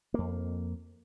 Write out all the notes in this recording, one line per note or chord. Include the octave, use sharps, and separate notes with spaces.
F2 A#3